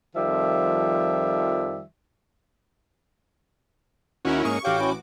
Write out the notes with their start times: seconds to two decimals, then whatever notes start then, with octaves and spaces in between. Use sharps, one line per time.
0.16 F2 D#3 F3 G3 E5
4.25 D#2 C#4 E4 F#4 A#4
4.45 G#2 A#3 C#4 C#6 D#6
4.65 A1 F#4 G4 C#5 F5 G5 D6
4.80 C#4 E4